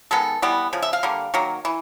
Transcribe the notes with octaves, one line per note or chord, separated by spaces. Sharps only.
D#3 G#3 B3 A4
E3 G3 B3
C#3 F3
E5
F5
D3 G3 A#3
D#3 F#3 A#3
E3